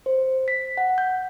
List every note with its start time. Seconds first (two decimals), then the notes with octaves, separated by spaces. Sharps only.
0.06 C5
0.48 B6
0.77 F#5
0.98 G6